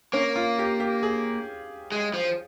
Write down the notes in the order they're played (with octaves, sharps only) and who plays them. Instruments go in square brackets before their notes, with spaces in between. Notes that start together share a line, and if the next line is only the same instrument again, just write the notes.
[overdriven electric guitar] A#3 [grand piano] C#4
[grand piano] F4
G4
G4
G#4
[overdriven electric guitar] G#3
F3